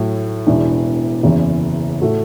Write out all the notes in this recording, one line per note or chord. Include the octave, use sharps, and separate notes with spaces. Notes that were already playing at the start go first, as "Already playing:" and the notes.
Already playing: A2 F#3 A3
E1 E2 E3 D4
F#1 E2 E3
A2 A3 F#4